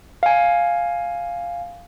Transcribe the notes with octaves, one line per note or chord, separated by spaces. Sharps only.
F5 G#5